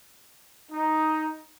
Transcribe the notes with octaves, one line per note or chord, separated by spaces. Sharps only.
D#4